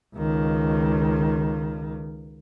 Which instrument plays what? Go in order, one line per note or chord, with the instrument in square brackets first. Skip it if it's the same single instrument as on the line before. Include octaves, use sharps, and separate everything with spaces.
[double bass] C#2 D#3